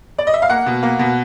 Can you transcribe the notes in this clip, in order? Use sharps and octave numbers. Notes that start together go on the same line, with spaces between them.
D5
D#5
E5
F5
A#3 F#5
B2
A#3
B2